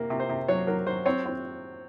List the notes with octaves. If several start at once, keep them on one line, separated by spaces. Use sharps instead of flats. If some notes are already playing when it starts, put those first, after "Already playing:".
Already playing: C3 A#3
C3
C5
C3
F#3 C#5
F#3 A#4
F#3 C5
C4 C#5
C4